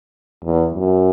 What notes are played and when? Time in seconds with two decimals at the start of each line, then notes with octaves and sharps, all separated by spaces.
0.45 E2
0.74 F#2